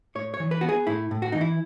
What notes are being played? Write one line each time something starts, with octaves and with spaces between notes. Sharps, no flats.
A2 C#5
C#5
E3
B4
B3 F#4
G#4
A2 E4
A2
F#4
E3 D#4
E4